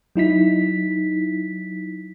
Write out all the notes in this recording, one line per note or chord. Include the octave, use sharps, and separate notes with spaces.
F#3 D#4 E4 B6